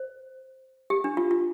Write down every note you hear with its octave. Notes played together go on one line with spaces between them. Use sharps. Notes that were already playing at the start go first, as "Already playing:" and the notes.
Already playing: C5
G4
D4
F4
F4